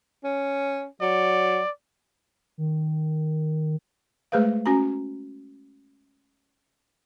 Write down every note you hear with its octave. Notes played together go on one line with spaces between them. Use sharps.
C#4
F#3 D5
D#3
G#3 A3 G#4 B4 C5 F5
C#4 F#4 G#5 A#5